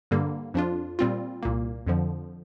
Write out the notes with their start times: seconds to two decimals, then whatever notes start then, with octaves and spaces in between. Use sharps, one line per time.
0.11 G2 D3 G3 A#3
0.54 F2 F3 D4 F4
0.99 A#2 G3 C4 F4
1.43 C2 A#2 A#3
1.87 F2 D3 F3